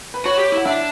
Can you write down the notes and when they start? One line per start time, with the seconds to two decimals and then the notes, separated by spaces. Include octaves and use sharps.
0.14 B4
0.25 F#4 C#5
0.39 G4
0.52 E4 F#5
0.65 D4 E5